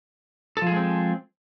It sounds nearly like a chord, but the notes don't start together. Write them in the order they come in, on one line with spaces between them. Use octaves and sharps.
A4 F3 G#4 G#3 C4